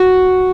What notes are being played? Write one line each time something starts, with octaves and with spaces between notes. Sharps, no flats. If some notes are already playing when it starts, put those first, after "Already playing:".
Already playing: F#4